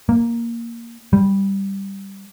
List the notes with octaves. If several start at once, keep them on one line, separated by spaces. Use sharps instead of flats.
A#3
G3